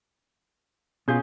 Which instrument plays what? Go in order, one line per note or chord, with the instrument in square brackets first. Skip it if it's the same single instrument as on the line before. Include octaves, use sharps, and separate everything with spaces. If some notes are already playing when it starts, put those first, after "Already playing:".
[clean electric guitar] B2 F4 [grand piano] C#4 G#4 G6